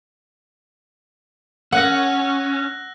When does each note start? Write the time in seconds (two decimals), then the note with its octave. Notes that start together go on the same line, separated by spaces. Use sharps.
1.72 C#4 F#5 E6 F#6 A#6